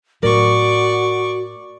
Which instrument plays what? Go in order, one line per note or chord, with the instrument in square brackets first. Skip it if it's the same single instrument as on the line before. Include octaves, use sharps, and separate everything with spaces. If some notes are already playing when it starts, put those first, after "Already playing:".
[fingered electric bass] A2 F#3 [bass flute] F#4 [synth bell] A#4 [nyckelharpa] D5 C#6